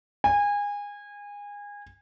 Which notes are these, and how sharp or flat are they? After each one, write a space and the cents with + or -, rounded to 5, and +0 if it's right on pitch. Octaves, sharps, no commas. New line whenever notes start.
G#5 -25